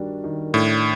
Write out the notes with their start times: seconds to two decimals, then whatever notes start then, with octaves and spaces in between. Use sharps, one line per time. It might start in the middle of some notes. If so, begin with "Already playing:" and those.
Already playing: D#3 G3 D4 F#4
0.24 D#3
0.54 A2 D4